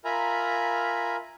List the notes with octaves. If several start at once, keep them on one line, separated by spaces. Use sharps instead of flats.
F4 A#4 E5 G#5 A#5 B5